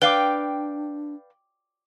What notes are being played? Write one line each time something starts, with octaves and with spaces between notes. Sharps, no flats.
D4 B4 D5 F5 G5 D6 G7